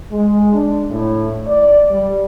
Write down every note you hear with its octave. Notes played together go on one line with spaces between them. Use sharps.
G#3
D4
A2
D5
G3